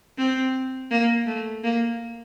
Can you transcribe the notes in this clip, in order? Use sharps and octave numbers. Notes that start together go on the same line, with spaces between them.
C4
A#3
A3
A#3